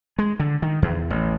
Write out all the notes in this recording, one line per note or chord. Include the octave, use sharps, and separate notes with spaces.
G#3
D3
D#3
E2
A1